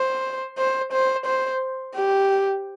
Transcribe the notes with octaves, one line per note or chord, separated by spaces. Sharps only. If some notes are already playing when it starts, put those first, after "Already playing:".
Already playing: C5
C5
C5
C5
G4